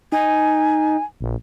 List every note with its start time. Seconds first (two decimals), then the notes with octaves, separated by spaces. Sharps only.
0.12 D#4 G#5
1.21 A#1